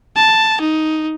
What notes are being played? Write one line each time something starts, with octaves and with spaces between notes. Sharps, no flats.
A5
D#4